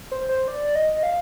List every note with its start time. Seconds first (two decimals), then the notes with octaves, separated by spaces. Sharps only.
0.12 C5
0.29 C5
0.48 D5
0.76 D#5
1.03 F5